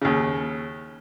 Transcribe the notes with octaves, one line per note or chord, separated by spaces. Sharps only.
D#2 C#3